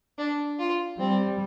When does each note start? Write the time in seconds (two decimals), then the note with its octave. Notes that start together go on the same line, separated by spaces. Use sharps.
0.18 D4
0.59 F4
0.99 G3 C4